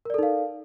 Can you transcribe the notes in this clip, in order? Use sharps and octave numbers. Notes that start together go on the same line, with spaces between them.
D#4 A4 A#4 D5 F5